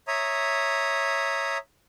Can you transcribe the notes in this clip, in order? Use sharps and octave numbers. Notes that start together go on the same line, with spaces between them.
C#5 E5 A#5 D#6